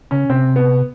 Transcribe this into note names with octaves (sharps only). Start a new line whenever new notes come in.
C#3 C#4
C3 C4
B3